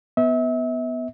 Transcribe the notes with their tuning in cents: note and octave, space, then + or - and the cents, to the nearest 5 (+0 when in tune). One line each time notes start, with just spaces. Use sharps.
B3 +0 E5 -35